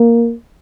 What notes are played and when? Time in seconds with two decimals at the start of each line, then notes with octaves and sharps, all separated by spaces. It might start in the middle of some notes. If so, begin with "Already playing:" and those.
Already playing: A#3